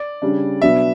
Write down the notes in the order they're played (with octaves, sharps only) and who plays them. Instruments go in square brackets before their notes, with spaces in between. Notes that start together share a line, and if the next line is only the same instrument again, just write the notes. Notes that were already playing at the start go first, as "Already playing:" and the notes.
Already playing: [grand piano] D5
[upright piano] C#3 G3 D4
[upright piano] B2 F#3 B3 D4 [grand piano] E5